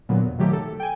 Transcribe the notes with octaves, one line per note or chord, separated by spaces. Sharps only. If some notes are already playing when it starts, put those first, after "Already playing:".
A#2 D3 F#3 B3
F2
C3 D#3 F#3 A3 G4
A4
G5 G#5